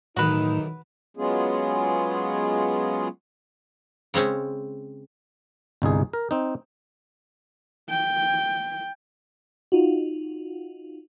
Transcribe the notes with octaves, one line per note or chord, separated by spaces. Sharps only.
B1 A2 D#3 E3 D#4 F#4 B4
F#3 G#3 B3 C#4 F4 G#4
C#3 G#3 C4 C#4
G1 C2 D#4 G#4
A#4
C4 D#4
G5
D#4 F4 F#4